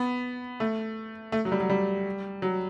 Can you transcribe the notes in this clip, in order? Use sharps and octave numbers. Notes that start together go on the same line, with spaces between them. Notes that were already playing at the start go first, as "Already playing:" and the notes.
Already playing: B3
A3
A3
F#3
G3
F#3
G3
F#3